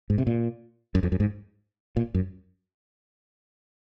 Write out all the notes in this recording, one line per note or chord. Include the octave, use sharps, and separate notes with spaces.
G#2
C3
A#2
F#2
F2
F#2
G#2
A#2
F#2